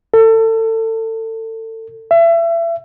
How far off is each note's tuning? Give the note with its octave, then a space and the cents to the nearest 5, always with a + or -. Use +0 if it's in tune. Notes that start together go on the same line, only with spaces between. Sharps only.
A4 +30
E5 +30